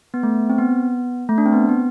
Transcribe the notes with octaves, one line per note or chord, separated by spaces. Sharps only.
B3
A3
C4
B3
A3
D4
C4
B3
B3